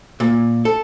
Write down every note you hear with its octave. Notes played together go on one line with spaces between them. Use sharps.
A#2
A4